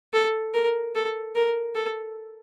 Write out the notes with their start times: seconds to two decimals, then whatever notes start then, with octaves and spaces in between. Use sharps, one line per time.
0.14 A4
0.54 A#4
0.95 A4
1.35 A#4
1.75 A4